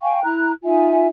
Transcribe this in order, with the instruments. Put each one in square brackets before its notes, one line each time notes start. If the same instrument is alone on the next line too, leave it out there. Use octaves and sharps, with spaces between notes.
[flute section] F5 G5 G#5 C#6
E4 A#5 F#6
D#4 F4 E5 G#5